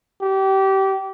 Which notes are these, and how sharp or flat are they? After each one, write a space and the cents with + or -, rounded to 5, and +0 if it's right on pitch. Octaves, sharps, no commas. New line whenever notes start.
G4 -25